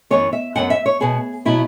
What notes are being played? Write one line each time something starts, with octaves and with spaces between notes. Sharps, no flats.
F#2 E3 B3 C#5
E5
F#2 F#3 B3 F#5
E5
C#5
B2 B3 G#4
B2 F#3 B3 E4